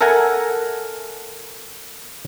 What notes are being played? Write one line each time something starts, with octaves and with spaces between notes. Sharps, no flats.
A4 A#4 E5 F#5 G#5 A#5